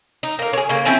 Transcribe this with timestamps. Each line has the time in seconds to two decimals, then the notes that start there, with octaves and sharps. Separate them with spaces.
0.23 D#4
0.39 A#3 A#4
0.53 G#4 C#5
0.69 C#3 A#3
0.85 F3 C4 C#4 E4